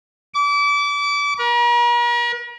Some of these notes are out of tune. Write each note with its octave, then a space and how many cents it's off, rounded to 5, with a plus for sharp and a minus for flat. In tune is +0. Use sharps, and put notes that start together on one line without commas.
D6 -30
A#4 +45